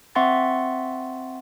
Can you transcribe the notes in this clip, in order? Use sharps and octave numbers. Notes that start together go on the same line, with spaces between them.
C4 E5 F#5 C6 C#6 A6